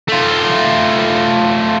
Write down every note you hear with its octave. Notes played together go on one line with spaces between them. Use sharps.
A3 F4